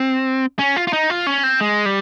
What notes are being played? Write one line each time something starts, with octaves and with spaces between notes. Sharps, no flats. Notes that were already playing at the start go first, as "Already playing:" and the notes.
Already playing: C4
C#4
F4
F4
D#4
F4
C#4
C4
G#3
G3